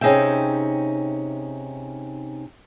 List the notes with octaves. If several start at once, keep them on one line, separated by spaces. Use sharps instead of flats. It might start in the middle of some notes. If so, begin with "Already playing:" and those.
C3 C#4 D#4 G#4 E5 G5